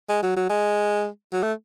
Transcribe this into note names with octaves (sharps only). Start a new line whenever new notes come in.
G#3
F#3
F#3
G#3
F#3
A3